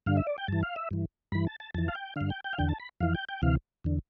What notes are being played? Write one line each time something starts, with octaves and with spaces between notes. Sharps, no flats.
G2 D3 F5
E5
D5
G5
G2 E3 A5
F5
E5
G2 E3
G2 E3 B5
A5
A5
F2 E3 A5
F5
G5
G2 D3 F5
G5
G5
F5
E2 D3 G5
A5
B5
F2 E3 F5
G5
G5
D2 C3 E3 F5
E2 D3